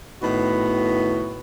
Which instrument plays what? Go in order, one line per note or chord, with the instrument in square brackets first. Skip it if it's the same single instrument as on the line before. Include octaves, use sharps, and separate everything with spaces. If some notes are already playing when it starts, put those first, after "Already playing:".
[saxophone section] A2 D#3 B3 F#4